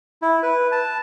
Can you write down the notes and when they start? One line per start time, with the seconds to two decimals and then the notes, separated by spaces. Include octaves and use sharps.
0.22 E4
0.43 B4
0.72 A5